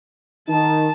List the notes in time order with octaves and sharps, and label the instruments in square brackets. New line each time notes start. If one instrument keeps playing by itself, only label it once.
[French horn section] D#3 D#4 [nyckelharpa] A5